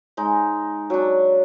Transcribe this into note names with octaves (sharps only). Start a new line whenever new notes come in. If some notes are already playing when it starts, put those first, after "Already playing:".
G#3 D#4 D#5
F#3 D4